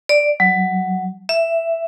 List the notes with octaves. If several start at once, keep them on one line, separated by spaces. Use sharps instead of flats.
D5
F#3
E5